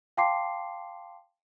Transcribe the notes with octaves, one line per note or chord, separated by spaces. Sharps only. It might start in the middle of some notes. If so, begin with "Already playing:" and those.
F5 G5 A5 C6 D6 C7